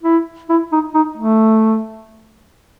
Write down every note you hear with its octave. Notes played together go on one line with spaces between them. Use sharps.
E4
E4
D#4
D#4
A3